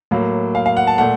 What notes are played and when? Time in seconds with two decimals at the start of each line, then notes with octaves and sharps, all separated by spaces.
0.11 A2 F#3 A#3
0.55 F5
0.66 F5
0.77 F#5
0.87 A5
0.98 A#2 A3 F#5